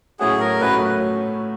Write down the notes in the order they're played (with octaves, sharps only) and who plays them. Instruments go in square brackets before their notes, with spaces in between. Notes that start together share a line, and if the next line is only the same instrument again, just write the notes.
[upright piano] A2 F#3 A3 C#4 F#4 [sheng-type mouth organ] G#4
[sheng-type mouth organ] A#4
[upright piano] A2 F#3 A3 C#4 F#4 [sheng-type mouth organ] B4